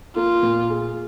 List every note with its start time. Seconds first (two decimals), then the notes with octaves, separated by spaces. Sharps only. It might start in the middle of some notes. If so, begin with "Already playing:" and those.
0.16 A#3 F4
0.42 A#2
0.70 G#4